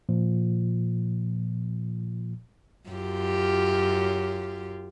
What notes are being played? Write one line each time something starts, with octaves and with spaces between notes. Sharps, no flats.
A#2 F3
F#2 F4 G4